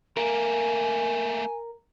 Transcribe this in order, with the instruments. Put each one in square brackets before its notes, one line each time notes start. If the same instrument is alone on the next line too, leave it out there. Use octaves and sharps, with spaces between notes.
[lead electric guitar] A3 A#3 [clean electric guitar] A#4 [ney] G#5